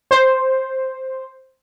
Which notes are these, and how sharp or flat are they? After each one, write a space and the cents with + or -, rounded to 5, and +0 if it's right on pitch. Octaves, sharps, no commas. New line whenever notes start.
C5 +0